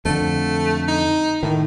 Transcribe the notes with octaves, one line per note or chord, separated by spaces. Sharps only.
F2 D3 A3
D#4
A2 D#3